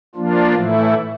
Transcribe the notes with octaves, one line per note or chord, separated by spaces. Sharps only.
F3 A#3 D4 F4
A2 E3 A3 E4